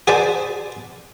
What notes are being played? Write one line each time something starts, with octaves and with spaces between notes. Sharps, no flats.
F#4 G#4 B4 C5 D5 A5